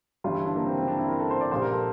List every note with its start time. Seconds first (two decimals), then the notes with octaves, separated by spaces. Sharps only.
0.24 G1 G2 E3 G3 F4
0.35 E4
0.45 D4
0.56 A#3
0.66 C4
0.77 C4
0.88 D4
0.99 E4
1.08 A#4
1.19 A4
1.31 C5
1.41 D5
1.51 A#1 A#2 G3 C5
1.62 A#4
1.72 A4